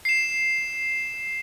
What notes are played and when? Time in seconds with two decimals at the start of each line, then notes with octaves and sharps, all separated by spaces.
0.05 C7 E7